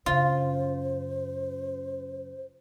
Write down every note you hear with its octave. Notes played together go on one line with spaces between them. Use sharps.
F#2 C#3 F4 C5